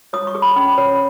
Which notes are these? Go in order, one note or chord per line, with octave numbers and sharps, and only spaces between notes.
C#5 D#6
C#6
G#4
B5
C#4
C#5